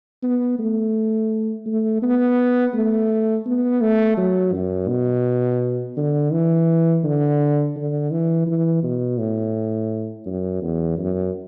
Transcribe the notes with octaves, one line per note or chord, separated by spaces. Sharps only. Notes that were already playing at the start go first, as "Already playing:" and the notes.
B3
A3
A3
B3
A3
B3
A3
F#3
F#2
B2
D3
E3
D3
D3
E3
E3
B2
A2
F#2
E2
F#2